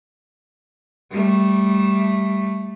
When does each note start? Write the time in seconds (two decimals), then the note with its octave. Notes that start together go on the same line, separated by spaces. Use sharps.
1.10 G3 A3